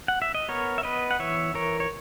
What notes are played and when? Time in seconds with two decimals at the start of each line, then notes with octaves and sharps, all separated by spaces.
0.08 F#5
0.22 E5
0.35 D#5
0.48 B3 A#4 C#5
0.78 E5
0.83 B3 B4 D#5
1.11 F#5
1.19 E3 C#5 E5
1.54 E3 A#4 C#5
1.80 C#5